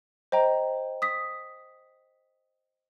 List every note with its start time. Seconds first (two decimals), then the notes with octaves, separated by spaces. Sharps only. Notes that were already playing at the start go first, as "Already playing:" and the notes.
0.32 C5 D#5 G5 A#5
1.02 D#6 B6